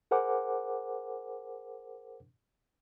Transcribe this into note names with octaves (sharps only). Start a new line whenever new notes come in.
G#4 A#4 C5 F#5 G#5 D6